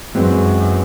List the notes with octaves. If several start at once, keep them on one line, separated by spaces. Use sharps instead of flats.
F#2 E3 G#3 C4